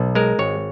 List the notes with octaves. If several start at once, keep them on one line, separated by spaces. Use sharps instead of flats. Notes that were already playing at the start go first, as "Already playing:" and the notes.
Already playing: B1
G#3 A#4
G#1 C#5